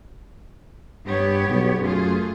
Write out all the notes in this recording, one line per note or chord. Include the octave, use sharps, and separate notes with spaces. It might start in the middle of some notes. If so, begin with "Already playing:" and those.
G2 B3 G4 C#5
B1
F#2 A3 F4 G#4